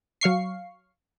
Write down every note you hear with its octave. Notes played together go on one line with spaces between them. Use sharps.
F#3 F5 C#6 C7